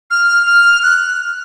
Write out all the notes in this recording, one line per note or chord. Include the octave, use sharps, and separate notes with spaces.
F6
F6
F#6